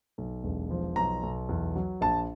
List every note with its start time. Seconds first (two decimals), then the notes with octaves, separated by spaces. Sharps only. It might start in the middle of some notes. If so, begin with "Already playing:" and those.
0.18 B1
0.44 E1
0.70 F3
0.96 B1 A#5
1.23 B1
1.49 E2
1.76 F#3
2.01 A#1 A5